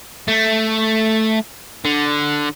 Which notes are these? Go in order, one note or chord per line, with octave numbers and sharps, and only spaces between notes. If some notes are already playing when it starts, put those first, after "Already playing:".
A3
D3